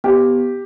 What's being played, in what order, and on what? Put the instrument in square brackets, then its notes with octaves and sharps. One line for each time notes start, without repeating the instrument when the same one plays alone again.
[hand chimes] B3 [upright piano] G4